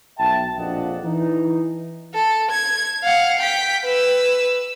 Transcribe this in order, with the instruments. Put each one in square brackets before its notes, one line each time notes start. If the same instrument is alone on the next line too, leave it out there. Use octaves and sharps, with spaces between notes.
[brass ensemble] B1 E5 G5 A5
A#1 F2 F3 D4 D#5 F#5
E3 D#4
[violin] A4
G#6
F5 F#5
G5 B6
B4 E6